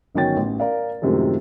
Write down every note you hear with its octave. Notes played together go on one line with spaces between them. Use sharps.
G1 D#3 F#3 C#4 G5 A6
A1
A#4 D5 F5
F#2 A2 C3 D#3 F3 G#3